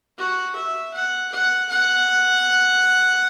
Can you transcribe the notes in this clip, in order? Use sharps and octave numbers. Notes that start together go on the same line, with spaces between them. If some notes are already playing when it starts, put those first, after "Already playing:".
F#4
E5
F#5
F#5
F#5